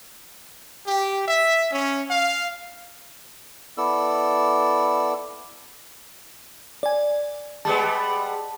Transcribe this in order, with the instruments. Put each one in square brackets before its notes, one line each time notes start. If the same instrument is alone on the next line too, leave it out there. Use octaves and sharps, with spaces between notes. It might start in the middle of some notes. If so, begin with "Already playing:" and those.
[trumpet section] G4
E5
C#4
F5
[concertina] B3 E4 A4 D5 E6
[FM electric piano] D5 G#5
[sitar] G3 G#3 B3 [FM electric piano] A5